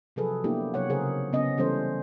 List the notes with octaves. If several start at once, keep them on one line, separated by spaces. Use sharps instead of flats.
C3 F3 F#3 G#4 A4 B4
A#3 B3 D4 E4 G4
C3 F#3 C#5 F#5
C#3 G#4 A#4 C5 F#5
C#3 B3 C#4 D#5
E3 G3 B3 C#4 A4 C5